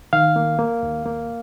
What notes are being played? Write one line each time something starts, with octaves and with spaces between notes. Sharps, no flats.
D#3 F5
A#3
A#3
D#2
A#3